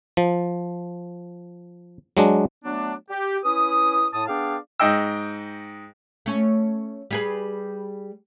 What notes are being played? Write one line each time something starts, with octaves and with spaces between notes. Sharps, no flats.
F3
F#3 G#3 D4
F#3 A3 B3 D4
G4
C#4 E4 B4 D#6
A2 A5 D#6
B3 D4 G#4 D5 F5 G5
G#2 D#5 G5 E6
A3 C#4
G3 G#4 B4